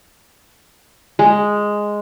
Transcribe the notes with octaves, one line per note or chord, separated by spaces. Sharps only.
G#3